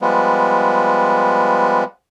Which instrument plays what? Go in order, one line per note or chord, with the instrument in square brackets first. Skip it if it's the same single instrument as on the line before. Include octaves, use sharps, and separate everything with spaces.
[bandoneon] F3 G3 G#3 B3